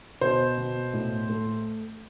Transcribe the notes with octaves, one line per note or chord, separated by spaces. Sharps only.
B2 C5
B2
A2
A3